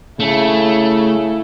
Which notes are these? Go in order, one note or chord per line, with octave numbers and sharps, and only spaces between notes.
C#3 A3 E4 A4